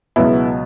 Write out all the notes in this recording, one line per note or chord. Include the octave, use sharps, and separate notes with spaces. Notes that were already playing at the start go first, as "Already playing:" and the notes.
C#2 B2 F#3 B3 E4